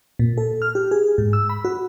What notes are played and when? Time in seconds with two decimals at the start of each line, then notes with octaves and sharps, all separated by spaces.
0.19 A#2
0.38 A4
0.62 F6
0.75 G4
0.91 G#4
1.18 G#2
1.33 E6
1.49 B5
1.65 F#4